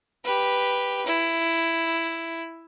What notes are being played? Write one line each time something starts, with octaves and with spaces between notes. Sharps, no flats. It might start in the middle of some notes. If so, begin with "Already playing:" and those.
G4 B4
E4